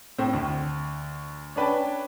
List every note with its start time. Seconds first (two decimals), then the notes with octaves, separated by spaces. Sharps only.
0.18 A2 C4
0.33 D2
1.56 C#4 D4 B4 G5 A5